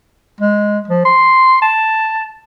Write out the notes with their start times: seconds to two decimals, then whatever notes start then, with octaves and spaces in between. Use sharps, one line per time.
0.40 G#3
0.88 F3
1.05 C6
1.62 A5